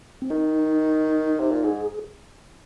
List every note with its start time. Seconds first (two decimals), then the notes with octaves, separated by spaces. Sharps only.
0.22 C4
0.30 D#3 D#4
1.39 C3
1.51 A#2
1.64 G#2 G#4